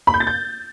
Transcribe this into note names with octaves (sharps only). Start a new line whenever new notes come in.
B5
G6
A6
G6